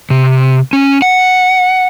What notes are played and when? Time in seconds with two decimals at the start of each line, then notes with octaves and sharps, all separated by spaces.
0.10 C3
0.73 C#4
1.02 F#5